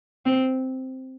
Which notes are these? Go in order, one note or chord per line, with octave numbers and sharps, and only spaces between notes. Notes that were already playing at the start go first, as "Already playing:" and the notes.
C4